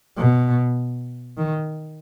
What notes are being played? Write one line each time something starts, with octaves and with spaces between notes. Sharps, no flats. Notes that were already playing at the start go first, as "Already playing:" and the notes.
B2
D#3